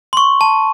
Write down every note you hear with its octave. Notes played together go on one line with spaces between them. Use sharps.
C6
C#6
A5